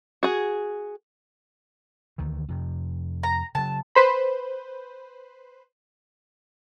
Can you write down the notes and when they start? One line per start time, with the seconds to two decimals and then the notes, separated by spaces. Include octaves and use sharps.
0.23 F#4 G#4
2.18 D2 D#3 E3
2.48 F2 C3
3.23 A#5
3.55 C#3 F#3 A5
3.95 B4 C5 B5